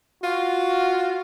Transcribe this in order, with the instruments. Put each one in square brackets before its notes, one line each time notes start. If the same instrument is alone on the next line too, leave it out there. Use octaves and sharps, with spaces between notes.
[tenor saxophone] F4 [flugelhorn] F#4